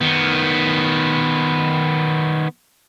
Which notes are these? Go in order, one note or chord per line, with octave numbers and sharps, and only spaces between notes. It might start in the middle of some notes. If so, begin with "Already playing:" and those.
D#3 B3